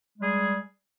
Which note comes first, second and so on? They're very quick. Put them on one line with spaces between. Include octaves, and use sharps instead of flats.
G#3 G3 G#4